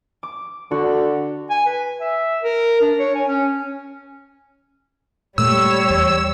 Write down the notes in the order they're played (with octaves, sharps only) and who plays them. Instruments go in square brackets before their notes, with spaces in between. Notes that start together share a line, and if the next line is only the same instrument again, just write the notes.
[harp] D6
[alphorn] D3 [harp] F#4
[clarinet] G#5
B4
E5
A#4
D4
C#5
G#5
C#4
[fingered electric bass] A#2 A3 [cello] G3 C#5 [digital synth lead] E6
[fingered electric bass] E2